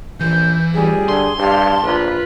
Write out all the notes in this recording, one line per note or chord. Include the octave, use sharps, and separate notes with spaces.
A#1 E3 G6
F1 G3 G#4
D3 C6
G2 G4 F5 A5
A#1 F4 B4